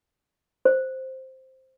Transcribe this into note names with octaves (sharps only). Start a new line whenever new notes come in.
C5